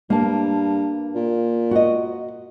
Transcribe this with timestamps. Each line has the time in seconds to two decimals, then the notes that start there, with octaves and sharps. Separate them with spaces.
0.10 G2 A#3 A5
1.15 A#2
1.71 F#4 D#5